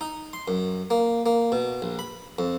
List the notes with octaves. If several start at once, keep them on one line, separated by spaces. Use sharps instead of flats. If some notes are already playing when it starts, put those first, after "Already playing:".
D#4
C6
F#2
A#3
A#3
B2
A#1
B5
F2